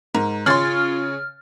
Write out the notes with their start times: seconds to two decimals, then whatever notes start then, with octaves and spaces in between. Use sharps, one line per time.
0.15 G#2 A#4
0.46 C#3 F4 G#4 C#5 C6 F6 A6